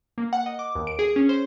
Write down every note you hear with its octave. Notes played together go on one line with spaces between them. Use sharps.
A#3
F#5
D#5
D6
D#2
D7
G#4
C#4
C5